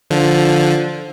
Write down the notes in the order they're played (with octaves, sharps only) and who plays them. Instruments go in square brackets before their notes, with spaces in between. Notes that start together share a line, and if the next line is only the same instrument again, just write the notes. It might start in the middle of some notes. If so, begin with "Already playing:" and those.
[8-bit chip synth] D3 F3